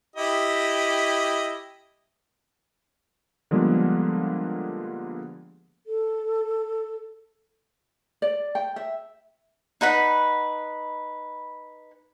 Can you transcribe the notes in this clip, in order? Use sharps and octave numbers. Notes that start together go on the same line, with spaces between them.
E4 G4 D#5
D3 F3 G3 G#3 A#3 B3
A4
D5
G5
E5
D#4 B4 F#5 B5